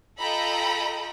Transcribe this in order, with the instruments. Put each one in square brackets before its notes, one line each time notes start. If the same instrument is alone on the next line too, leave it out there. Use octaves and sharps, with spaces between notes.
[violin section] F4 A4 D#5 G5 A#5 B5